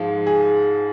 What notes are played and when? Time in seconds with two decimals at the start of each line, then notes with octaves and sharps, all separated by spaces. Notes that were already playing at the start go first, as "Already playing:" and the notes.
Already playing: G#2 F3 G#3 F4
0.27 G#4